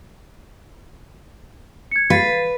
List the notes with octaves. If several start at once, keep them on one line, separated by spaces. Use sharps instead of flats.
G#6 C#7
B4 F5 A6 C7